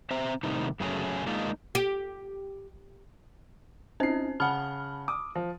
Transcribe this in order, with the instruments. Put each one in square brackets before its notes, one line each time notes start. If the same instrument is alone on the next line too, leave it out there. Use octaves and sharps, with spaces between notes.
[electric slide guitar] C4 C5 E5 A#5
A2 C3 D#3 G3 D#4
F#2 C#3 F#3 A3 G#4 G#5
G#3 A#3 D4 D#4 F4 G#4
[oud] G4
[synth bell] C4 C#4 C5 [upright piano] D#4 C7
[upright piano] C#3 F#5 [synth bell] A5 B5 F6
[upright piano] D6 D#6
F3